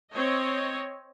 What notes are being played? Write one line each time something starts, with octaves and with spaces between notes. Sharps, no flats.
C4 C#5 D#5